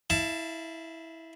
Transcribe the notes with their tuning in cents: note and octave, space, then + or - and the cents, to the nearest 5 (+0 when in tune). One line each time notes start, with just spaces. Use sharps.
E4 -15 F5 -35 A5 +5